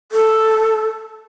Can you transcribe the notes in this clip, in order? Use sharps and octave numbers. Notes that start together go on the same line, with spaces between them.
A4